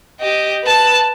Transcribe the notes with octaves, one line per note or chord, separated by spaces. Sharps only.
G4 D#5
B4 A5